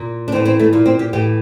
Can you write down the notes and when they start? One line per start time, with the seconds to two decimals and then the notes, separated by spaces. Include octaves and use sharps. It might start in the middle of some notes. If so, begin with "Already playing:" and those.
Already playing: A#2
0.28 D4
0.32 A2 C4
0.35 E3
0.45 C4
0.60 A3
0.73 A#2 A#3
0.86 C4
0.99 G4
1.13 A2 E3 G4